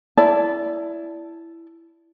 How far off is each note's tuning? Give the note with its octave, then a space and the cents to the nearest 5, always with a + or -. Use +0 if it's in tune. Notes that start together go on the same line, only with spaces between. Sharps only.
E4 +10 D5 -15 A5 +0